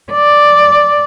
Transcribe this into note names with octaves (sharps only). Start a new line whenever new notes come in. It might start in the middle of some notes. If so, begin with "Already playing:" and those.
D5